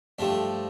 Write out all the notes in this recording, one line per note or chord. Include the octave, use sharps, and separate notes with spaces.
G2 F3 A3 D4 G4